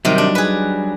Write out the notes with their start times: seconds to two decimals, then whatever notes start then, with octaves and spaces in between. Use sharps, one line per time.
0.05 C3 D#3 F#3 G3
0.18 D4
0.35 G#4 B4